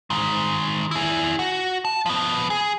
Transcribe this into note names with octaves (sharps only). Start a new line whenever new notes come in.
D#3 G#3
E4 G#4
F#4
A5
F3 B3
G#4